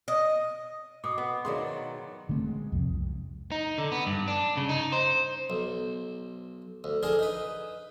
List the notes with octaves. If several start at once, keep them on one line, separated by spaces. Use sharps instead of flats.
D#5
B2 D6 D#6
B3
B2 D#3 F#3 G#4 D5 F5 F#5 C6
D3 A3 C4
G#3
C2 F2
D#4
D3
B3
G2
D4
C#3
D#4
C5
B1
D2
D3 D4 G#4 A#4
D#4 B4